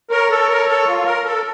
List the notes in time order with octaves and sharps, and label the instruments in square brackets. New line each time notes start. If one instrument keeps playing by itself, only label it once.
[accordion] A#4 [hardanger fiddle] C#5
[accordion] A4
A#4
A4
F4
A#4
A4